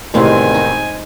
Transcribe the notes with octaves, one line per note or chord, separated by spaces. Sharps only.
E2 A2 C3 D#3 G#3 C4 F5 G#5
D#4